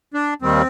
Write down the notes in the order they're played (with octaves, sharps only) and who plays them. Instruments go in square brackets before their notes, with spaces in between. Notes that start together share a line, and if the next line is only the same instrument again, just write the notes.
[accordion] D4
D#2 D#3 G3 C4